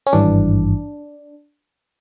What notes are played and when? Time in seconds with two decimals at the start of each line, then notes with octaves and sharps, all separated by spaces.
0.07 C#4
0.13 G#1 G2 E3 D4